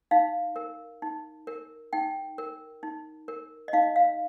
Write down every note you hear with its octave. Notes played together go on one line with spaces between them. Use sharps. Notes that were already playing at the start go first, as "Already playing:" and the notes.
D#4 F5
A#4
D#4
A#4
D#4 G5
A#4
D#4
A#4
D#5
D#4 F5
F5